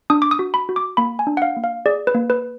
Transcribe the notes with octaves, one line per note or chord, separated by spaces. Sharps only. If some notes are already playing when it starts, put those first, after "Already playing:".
D4 D#6
D6
D#6
F#4
B5
F#4
D6
A#3 B5
G#5
D4
F#5
F5
A#3
F5
G#4 D5
B4
A#3
B4